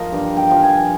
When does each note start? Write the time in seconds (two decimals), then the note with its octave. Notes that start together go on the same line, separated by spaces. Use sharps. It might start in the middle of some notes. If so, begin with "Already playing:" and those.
Already playing: F3 A#4 D#5
0.12 G2 F5
0.37 G5
0.51 F3
0.62 G#5